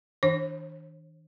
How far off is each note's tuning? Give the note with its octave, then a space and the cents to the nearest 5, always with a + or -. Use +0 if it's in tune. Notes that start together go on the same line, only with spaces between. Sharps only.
D#3 +45 D4 +0 C5 +35